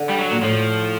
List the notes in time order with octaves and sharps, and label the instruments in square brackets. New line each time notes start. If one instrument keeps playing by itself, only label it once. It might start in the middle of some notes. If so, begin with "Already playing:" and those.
Already playing: [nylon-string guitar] D3
[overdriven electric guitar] G3
F#3
[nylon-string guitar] A#2
[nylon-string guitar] A2 [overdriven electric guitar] F3